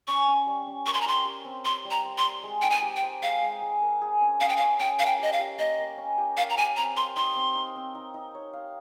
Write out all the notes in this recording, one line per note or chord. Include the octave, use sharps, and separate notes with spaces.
C#4 C#6
C#4
G3
C#4
A#4 C#6
C6
A#5
G4 C6
G4
C4
C5 C6
G3
A#5
C5
C6
C5
G#3
D#4 G5
G#5
G4
G5
C5
G#3 F5
G#3
G#3
A#4
G#4
C#4
C#4 F5
G5
F5
C#4
C#4 G5
A#4 F5
G5
G4 D#5
F5
G4
A#3 D#5
A#3
C#4
G4
A#4 F5
A#5
G4 G#5
C4 A#5
A#4 C6
D#4 C6
C4
D#4
C4
D#4
D#4
C#5
F5